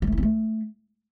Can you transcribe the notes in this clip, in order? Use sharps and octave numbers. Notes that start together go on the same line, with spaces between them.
G3
A3
E4
C4
A3